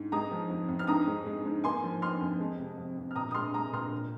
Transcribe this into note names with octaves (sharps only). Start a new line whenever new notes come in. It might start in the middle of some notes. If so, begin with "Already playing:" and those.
Already playing: G#2
G#3 A#5 D#6
F3
F2
F2
F6
G#2 A#5 D#6
G#3
G#3
G#2
A#3 G#5 C6
F3
F2 C6 F6
F2
G#3
C3
F2
F2
F6
A#2 A#5 D#6
D#6
G#3 C6 F6
G#3 A#5 D#6
A#2 C6 F6
A#2